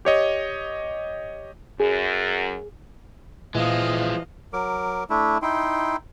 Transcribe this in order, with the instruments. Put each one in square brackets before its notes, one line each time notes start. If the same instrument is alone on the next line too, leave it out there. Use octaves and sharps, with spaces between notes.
[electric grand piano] G4 C#5 D#5
[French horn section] F#2 [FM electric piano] G#4
[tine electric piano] A#2 [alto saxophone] E3 [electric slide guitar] F3 G#3 [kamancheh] D#5 F5
[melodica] F#3 A#4 D6
A3 D4 E4
D#4 E4 G5 C6